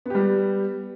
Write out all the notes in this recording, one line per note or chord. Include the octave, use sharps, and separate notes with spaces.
G3 B3 G4